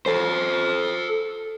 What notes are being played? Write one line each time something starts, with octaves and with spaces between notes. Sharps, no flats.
A4 C5